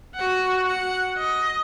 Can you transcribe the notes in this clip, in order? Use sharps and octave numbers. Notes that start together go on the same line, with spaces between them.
F#4 F#5
F#5
D#5